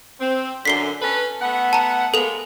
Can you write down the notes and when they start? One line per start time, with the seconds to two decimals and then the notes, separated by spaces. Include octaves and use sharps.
0.20 C4
0.65 F#2 D3 B6 C7 G7
1.01 C#4 A4 B4
1.41 A3 B3 F#5
1.73 A5 A#5
2.14 G#3 A#3 B3 A4 F7